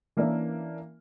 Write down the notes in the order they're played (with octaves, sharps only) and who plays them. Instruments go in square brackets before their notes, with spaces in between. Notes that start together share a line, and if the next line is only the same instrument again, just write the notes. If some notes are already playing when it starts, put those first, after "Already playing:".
[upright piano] E3 A#3 C#4 D4 A#4 E5